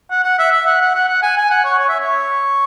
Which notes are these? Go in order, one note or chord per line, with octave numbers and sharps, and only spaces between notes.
F#5
F#5
E5
E5
F#5
F#5
F#5
F#5
G#5
G#5
F#5
C#5
C#5
E5
C#5